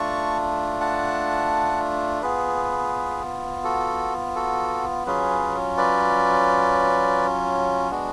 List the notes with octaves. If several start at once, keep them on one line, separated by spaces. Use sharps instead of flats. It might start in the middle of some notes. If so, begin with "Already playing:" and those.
Already playing: A3 D4 F4 A5 C#6
F#5 A5
B3 F4 G#4 B4
F#4 A4
F#4 A4
F#3 C#4 F4 G#4 B4
B4 D5
G#3 B3 D4 F#4